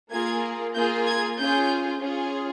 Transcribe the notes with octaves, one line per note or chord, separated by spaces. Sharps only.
A#3 F4 G#4 G#6
A#3 F4 G#4 G6
G#6
C#4 F4 G#4 G6
C#4 F4 G#4